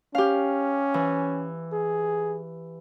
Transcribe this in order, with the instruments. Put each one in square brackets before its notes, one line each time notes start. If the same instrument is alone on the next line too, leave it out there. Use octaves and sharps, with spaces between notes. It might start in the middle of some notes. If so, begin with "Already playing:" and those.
[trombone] C#4 [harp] G4 F5
[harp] E3
[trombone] G#4